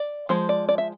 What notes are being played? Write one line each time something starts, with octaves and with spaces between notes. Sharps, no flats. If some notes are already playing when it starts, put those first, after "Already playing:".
Already playing: D5
F3 G#3 C5
D5
D5
E5